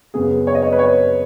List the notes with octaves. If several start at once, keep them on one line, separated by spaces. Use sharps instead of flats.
F#2 C#3 B3 G#4
C#5
D#5
C#5
B4
C#5